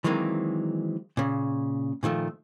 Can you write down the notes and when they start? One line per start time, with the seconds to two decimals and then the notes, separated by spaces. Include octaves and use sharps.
0.04 D#3 E3 F#3 G#3 A#3 C4
1.17 A#2 C#3
2.03 A#2 D#3 F3 A3